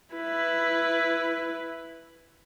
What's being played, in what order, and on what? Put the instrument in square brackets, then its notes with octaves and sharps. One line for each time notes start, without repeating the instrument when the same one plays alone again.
[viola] E4 B4